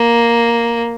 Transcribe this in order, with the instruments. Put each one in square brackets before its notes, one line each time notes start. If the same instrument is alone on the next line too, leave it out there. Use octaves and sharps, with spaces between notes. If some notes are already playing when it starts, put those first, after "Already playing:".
Already playing: [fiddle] A#3